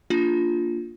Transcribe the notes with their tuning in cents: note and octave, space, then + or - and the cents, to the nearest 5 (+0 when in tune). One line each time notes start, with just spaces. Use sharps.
A#3 +0 D4 +0 F4 +0